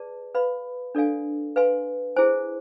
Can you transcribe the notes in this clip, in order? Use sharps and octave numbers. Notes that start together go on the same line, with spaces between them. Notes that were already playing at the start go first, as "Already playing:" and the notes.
Already playing: G#4 B4 D5 A5
B4 F5 B5
D4 A4 D5 F5 G#5
B4 F5 G#5 C6
E4 G#4 C5 G#5